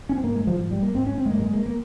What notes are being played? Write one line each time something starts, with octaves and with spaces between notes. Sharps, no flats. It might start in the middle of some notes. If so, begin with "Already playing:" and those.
C#4
C4
G#2 A#3
G#3
F3
G#2 F3
G3
A#3
G#2 C4
C#4
C4
G#3
G#2 A#3
G3
G#3
A#3
A#3